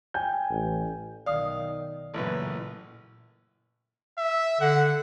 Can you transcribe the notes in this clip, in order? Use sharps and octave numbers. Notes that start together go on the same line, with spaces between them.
G5 G#5 G6
A1
B1 D#3 D5 F5 D#6
A1 F#2 A#2 C#3 B4
E5
D3 F#5